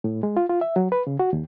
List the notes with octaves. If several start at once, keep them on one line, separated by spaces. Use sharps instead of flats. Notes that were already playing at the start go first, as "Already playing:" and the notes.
A2
G#3
F4
F4
E5
F#3
B4
C#3
F#4
D#2